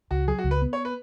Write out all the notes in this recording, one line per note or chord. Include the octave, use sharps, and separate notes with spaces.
C#2 F#4
F#3 G#4
F#4
C#2
B4
B3
C#5
B4